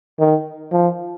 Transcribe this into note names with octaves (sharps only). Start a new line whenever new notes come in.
D#3
F3